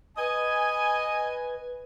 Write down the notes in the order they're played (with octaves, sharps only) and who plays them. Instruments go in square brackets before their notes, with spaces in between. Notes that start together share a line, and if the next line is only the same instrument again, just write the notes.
[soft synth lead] B4 [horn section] D#5 G#5